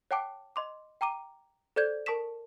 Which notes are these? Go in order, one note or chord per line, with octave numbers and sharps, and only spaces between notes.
C#5 F#5 G5 A5 D6
D#5 C6 D6
G5 A#5 D6 D#7
A4 C5 D5 G6 G#6
A#4 A5 C#6 D#6 B6 E7